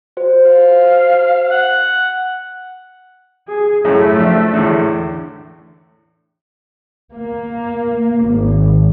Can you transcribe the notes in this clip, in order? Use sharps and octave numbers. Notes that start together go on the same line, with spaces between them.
F#4 C5
F5
F#5
G#4
F#2 A2 C#3 A3
F3 D4
E2 A2 D3
A#3
G#1